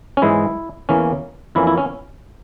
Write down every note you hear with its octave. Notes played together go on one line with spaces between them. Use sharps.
C#4
G#2 E3 G#3 E4
E2 E3 A#3 C#4
F2 E3 A#3 C#4 E4
E4
C#4